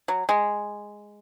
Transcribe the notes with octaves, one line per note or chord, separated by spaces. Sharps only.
F#3
G#3